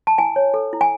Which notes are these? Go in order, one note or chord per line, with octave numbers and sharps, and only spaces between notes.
A5
E4 G#5
C#5
A4
E4
G#5